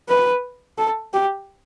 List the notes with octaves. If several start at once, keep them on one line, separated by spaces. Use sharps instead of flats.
B4
A4
G4